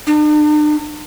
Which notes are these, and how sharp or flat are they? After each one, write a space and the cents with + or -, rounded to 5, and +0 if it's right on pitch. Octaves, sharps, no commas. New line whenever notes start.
D4 +45